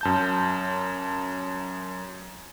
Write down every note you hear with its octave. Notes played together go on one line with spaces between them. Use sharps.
F#2 A5 G6